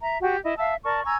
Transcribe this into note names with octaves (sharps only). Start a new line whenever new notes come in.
E5 A#5
F#4 G4 G5
E4 D#5
E5 F5 A5 E6
A#4 D5 A5 C#6
G#5 A#5 C#6 E6